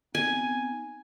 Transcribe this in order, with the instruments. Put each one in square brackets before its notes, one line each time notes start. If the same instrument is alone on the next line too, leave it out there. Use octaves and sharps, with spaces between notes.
[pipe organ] B3 C4 D#4 [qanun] G#5